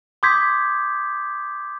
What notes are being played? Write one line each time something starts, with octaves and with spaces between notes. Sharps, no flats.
C6 D6 D#6 G6 G#6 B6